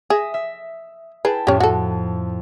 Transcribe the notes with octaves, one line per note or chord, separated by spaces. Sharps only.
G#4 E5 D#6 A#6
E5
E4 G#4 B4 G5 A5
F2 A2 C#4 G4
F#4 A4